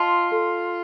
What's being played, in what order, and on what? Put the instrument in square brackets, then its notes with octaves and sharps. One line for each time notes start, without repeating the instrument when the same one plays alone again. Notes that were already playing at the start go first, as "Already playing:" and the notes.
Already playing: [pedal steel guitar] F4 [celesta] D#5 A5 C6
[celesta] A4